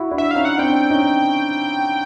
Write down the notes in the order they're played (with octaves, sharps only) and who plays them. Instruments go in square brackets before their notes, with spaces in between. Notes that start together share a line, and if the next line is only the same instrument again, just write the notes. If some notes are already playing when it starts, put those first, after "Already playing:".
Already playing: [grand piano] E4 F#4
D4 E4
[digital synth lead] E5
[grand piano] C#4 D#4 [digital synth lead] F5
[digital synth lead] F#5
[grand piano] C4 D4 [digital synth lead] G5
[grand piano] C#4 D#4